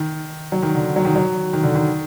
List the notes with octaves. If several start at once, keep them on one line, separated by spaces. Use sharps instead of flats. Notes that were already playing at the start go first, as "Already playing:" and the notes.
Already playing: D#3
F#3
D#3
D3
F#3
D#3
F#3
D#3
D3
D#3